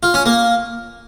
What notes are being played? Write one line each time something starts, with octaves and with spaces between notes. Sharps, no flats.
F4
C#4
A#3